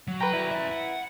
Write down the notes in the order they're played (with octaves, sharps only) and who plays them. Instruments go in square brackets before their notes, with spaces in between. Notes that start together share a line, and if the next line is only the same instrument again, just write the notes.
[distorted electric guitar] F#3
[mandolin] B4 A#5 [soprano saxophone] G5
[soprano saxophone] E4 [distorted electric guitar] F#4 D5
[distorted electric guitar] A#4 E5
F#5